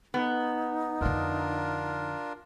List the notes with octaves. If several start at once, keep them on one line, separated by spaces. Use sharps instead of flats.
B3 D#4
F2 D3 D4 F4 A#4